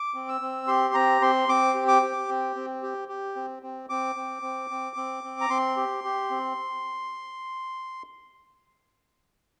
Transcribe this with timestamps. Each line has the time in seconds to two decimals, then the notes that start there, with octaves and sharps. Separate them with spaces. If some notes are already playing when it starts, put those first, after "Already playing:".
Already playing: D6
0.14 C4
0.29 E6
0.41 C4
0.67 G4 C6
0.94 C4 A#5
1.21 C4 C6
1.49 C4 D6
1.75 G4
1.88 D6
2.03 G4
2.29 C4
2.56 C4
2.83 G4
3.08 G4
3.36 C4
3.63 C4
3.89 C4 D6
4.16 C4
4.42 C4
4.70 C4
4.96 C4
5.24 C4
5.41 A#5
5.50 C4 C6
5.77 G4
6.04 G4
6.30 C4